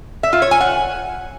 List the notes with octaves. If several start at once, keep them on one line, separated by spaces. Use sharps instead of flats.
E5
F4
C#5
G#5
F#5